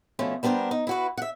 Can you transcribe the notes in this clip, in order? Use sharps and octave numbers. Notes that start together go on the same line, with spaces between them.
B2 F3 A3 C#4
G3 B3 D4 A#4 C5
D#4
E4 F#4 B4
E5 F#5